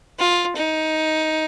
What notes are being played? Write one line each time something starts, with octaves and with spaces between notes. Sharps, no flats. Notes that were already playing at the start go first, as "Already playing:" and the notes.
F4
D#4